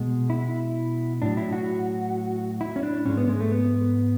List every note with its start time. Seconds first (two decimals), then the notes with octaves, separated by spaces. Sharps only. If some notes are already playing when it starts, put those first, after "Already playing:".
Already playing: B2 G#3
0.30 E4
1.22 A2 F#3 D4
1.37 E4
1.53 F#4
2.61 E4
2.76 C#4
2.83 D4
3.06 G#2 G#3 C#4
3.17 B3
3.29 G#3
3.41 A3
3.52 B3